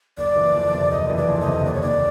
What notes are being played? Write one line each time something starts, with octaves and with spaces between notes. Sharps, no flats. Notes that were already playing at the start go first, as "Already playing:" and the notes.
F#1 D5
E3
F2
C3
F#1 D#5
E3
D5
F2
D#5
C3
D#2 D5
C#5
D#2 D5